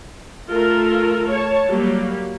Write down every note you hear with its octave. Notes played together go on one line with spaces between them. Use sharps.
A3 F4 A4 A#4
C#5 A5
F#3 G3 A#3 G4